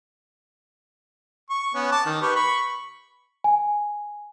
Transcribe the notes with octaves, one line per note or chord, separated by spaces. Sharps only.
C#6
B3 C#4
A5 D6
D#3
G4 B4 C#6
B5 C#6
G#5